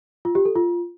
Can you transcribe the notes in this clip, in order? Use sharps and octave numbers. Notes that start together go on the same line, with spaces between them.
F4
G4
A4
F4